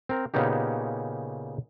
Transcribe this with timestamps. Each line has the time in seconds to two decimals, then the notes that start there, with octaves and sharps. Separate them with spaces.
0.09 C4 A#4
0.34 A#2 C#3 B3 C#4 D#4 G4